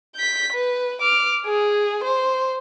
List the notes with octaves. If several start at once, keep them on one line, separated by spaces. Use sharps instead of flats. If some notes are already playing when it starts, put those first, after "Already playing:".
G6 B6
B4
D6 F6
G#4
C5